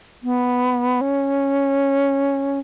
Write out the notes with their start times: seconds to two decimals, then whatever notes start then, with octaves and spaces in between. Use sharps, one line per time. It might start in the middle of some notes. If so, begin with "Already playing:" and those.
0.23 B3
1.01 C#4